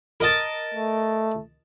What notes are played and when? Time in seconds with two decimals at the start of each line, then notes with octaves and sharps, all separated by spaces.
0.20 A#4 D#5 A5
0.75 A3